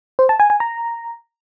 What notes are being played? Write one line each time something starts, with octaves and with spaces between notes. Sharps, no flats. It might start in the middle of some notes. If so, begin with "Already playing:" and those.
C5
A5
G#5
G#5
A#5